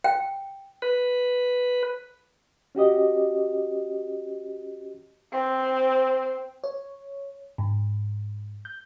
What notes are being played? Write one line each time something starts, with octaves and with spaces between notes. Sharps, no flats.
G5
B4
C#4 F#4 G4 D#5
C4
C#5
G#2
G6